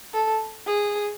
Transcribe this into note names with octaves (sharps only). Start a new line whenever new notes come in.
A4
G#4